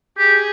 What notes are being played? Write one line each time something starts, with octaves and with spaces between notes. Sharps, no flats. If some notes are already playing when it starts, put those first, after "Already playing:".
G4 G#4